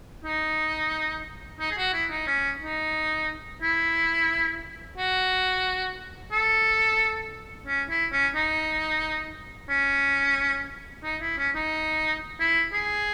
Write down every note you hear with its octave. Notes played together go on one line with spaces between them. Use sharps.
D#4
D#4
G#4
F#4
E4
D#4
C#4
D#4
E4
F#4
A4
C#4
E4
C#4
D#4
C#4
D#4
E4
C#4
D#4
E4
G#4